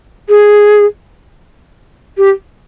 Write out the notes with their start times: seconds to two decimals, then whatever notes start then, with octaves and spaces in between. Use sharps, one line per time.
0.29 G#4
2.18 G4